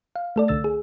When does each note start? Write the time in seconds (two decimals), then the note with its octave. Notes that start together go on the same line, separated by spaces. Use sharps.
0.16 F5
0.36 A3 A4 D5
0.48 C2 D3 E6 A6
0.64 G#4